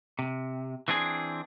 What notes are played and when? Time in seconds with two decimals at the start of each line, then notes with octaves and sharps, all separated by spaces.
0.19 C3
0.88 E3 C4 D4 G#4